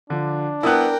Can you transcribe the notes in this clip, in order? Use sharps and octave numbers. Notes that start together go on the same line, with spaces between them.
D3 F3 D4
B3 E4 A#4 G5 A5 D#6 F#6